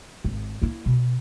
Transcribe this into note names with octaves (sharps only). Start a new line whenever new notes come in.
G#1
A#3 E4
B2